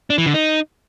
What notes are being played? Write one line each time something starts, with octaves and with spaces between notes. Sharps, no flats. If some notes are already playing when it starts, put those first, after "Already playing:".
D4
E3
D3
D#4